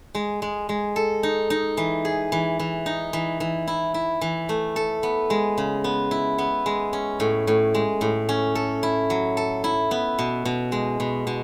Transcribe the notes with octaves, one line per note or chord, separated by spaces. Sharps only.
G#3
G#3
G#3
A4
D#4
D#4
E3
G#4
E3
E3
D#4
E3
E3
E4
E4
E3
A3
A4
B3
G#3
C#3
B3
E4
B3
G#3
C#4
A2
A2
G#3
A2
C#4
A4
E4
F#3
A4
E4
B3
B2
B2
G#3
B2
B2